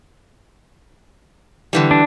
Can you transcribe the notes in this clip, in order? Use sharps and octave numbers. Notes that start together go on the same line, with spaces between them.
D3 E3 G3
D4